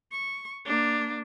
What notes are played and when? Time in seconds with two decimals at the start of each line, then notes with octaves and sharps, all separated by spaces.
0.12 C#6
0.66 A#3 D4